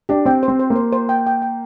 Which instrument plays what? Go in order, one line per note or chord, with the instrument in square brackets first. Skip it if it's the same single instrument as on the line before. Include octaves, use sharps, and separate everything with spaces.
[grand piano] D4 [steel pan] G4
[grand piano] C4 [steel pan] G5
[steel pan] C5
[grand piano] C4
[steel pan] C5
[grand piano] A#3
[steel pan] C5
C5
G5
G5
G5